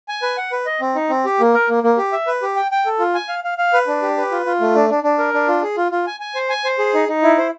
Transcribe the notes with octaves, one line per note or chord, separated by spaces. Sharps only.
G#5
B4
F#5
B4
D#5
C4
D#4
C4
G4
A#3
A#4
A#3
A#3
G4
E5
B4
G4
G5
G5
A4
F4
G#5
F5
F5
F5
B4
D4
G4
B4
F4
F4
A3
D4
D4
D4
A#4
D4
F4
G#4
F4
F4
G#5
G#5
C5
G#5
C5
G#4
D#4
D#4
E4
C5